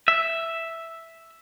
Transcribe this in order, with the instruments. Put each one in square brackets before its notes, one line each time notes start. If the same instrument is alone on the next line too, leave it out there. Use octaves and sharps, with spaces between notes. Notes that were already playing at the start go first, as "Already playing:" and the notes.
[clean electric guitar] E5